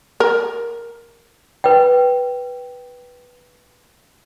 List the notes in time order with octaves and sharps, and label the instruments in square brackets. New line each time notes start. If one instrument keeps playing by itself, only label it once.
[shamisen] A#4
[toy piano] B4 G5